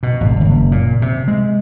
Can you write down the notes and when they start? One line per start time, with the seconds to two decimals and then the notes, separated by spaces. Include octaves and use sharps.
0.03 B2
0.21 G#1
0.41 F#1
0.72 A#2
1.02 C3
1.28 G#3